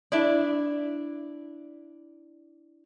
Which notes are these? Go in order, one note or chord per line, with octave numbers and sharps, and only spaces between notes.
D4 E4 D5